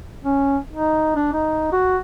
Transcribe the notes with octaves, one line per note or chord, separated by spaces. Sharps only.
C#4
D#4
D4
D#4
F#4